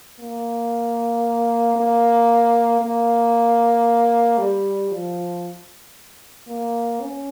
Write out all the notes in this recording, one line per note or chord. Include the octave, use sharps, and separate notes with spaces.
A#3
A#3
A#3
G3
F3
A#3
C#4